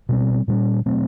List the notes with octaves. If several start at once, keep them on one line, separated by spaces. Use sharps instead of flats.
B2 G3 C4
A#2 G3 A#3 C#4
B2 F#3 A3 C4